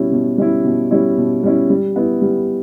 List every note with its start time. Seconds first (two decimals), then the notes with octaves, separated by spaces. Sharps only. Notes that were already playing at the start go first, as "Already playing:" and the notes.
Already playing: B2 G3 C#4 E4
0.12 B2
0.38 G3 C#4 E4
0.64 B2
0.91 G3 C#4 E4
1.18 B2
1.43 G3 C#4 E4
1.70 G3
1.96 B3 E4
2.22 G3